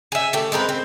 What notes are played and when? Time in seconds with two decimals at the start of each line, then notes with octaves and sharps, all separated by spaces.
0.12 G#4 E5
0.33 A3 G4
0.52 G#3 C4 A#4 B4
0.69 C4